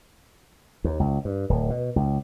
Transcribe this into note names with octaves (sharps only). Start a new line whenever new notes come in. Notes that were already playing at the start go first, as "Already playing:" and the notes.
D#2
C#2
G2
D1
B2
C#2